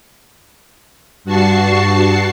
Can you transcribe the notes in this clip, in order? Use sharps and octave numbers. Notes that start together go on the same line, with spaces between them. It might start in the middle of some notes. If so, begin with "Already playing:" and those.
G2 F#4 A5 C#6 C7